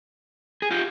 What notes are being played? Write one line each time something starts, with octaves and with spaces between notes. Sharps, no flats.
G#4
F4 G4